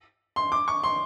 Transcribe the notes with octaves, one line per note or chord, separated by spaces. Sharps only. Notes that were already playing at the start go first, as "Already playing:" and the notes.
C6
D6
C#6
C6